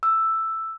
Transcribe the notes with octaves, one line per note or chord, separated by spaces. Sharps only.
E6